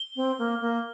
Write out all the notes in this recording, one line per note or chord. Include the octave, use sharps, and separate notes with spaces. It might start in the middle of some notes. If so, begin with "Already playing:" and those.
Already playing: G7
C4
A#3
A#3